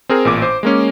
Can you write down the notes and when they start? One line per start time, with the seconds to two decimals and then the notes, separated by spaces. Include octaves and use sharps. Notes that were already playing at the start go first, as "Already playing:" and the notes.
0.09 C4 G#4 A#4
0.25 A1 A#2 D6
0.42 C5
0.63 G#3 A#3 C#4